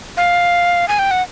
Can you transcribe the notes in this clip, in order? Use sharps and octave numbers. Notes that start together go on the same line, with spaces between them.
F5
G#5
G5
F#5